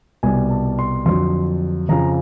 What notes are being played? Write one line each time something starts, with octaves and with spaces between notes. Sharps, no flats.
C2 B2 G3 G#5
A5
C6
F2 D3 F#3 C6
F2 C#3 F3 A#5